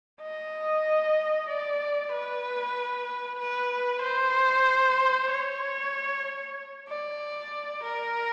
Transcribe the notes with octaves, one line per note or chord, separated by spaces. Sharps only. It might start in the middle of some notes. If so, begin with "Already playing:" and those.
D#5
D5
B4
B4
C5
C#5
D5
A#4